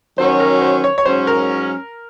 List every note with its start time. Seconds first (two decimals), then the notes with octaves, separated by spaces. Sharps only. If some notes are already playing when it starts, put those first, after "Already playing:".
0.18 D#3 F#3 C#4 F#4 C5
0.40 A#4
0.62 C5
0.84 C#5
0.98 C#5
1.05 G#2 F#3 C#4 C5
1.27 A#4